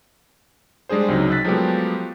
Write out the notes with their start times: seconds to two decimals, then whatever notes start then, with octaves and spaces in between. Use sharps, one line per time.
0.89 G3 G#3 D4 G#4 C5
1.08 C#2 C3 F#3 D#4
1.31 E6 F#6 A6 B6
1.45 F3 F#3 G#3 A3 B3 G4